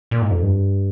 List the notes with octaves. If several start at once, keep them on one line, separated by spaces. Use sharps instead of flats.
A#2
G#2
F2
G2